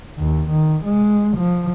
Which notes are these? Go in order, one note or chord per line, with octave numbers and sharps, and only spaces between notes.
D#2
D#3
G#3
F3